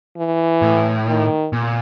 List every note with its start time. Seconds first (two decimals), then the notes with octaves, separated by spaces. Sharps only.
0.17 E3
0.62 A2
1.08 D#3
1.53 A#2